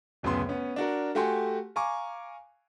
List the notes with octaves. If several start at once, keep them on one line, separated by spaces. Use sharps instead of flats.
D1 F#2 C#3 B3 C6
B3 C#4
D4 F#4 A#4
A3 F#4 G4 G#5 C6
F5 G#5 A#5 C#6 D6